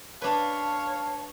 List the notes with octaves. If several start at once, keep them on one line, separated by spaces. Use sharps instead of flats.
D4 B4 C#5 F5 A5